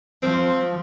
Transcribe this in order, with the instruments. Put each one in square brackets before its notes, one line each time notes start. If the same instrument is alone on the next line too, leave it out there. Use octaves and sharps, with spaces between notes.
[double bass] F3 [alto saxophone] C4